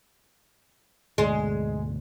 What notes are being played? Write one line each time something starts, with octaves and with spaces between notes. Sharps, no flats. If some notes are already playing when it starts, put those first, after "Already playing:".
D2 G#2 B2 G#3